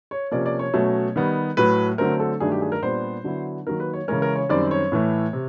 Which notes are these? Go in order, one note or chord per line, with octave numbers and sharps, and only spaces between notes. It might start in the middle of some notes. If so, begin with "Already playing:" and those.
C#5
C3 F3 A#3 C#4 D5
D5
C#5
B2 F#3 A3 C#4
D#3 G3 B3 D#4
A2 F#3 A3 B4
D3 F#3 A3 C4 A#4
A4
G2 D#3 F#3 A3 D4 G#4
G4
G#4
A#4
A#2 G3 B3 D4 C5
D3 F#3 B3 E4
D#3 F#3 A#3 D#4 A#4
B4
C#5
C#3 E3 G#3 C#4 A#4
A#4
C#5
F#2 D#3 G3 C4 D5
C#5
A2 E3 A3
C3